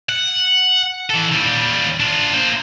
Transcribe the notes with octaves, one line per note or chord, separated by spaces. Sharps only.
F#5
E3 A4
D#2 G3
D4 F4
A#3 C5